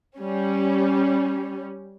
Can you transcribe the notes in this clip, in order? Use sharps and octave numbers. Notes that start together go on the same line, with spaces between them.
G3 C#4